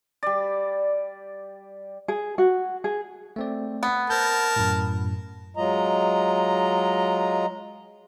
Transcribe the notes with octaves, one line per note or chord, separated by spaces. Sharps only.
G3 D5
G#4
F#4
G#4
A3 C4 D5
B3
A#4 C5 A5 G6
F#2 A2
F#3 G#3 F4 D#5 A#5